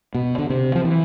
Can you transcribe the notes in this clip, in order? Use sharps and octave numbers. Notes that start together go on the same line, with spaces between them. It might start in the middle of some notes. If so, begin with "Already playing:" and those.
B2
D3
C3
F3
E3